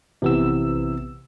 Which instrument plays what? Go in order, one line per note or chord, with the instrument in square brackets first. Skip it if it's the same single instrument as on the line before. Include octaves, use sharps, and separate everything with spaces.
[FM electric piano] A#1 B3 E6 [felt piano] C3 E3